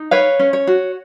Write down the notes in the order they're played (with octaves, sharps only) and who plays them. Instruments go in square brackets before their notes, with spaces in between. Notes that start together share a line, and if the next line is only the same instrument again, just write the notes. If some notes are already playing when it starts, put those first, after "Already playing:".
Already playing: [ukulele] D#4
B4 C#5 F5
C#4
C#5
F#4